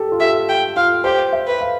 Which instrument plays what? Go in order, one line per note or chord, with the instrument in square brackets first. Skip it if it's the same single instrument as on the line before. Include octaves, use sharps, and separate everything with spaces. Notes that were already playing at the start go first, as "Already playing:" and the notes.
Already playing: [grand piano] G4 A4
F4
[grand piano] G4 [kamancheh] E5
[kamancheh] G5
[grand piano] F4 [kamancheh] F5
[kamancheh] G4 [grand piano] C5
[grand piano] E5
[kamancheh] B4
[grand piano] F5